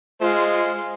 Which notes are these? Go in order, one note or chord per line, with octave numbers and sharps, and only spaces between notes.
G#3 F4 C5